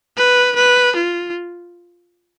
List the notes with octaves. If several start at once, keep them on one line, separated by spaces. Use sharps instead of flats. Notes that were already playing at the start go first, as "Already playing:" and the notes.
B4
B4
F4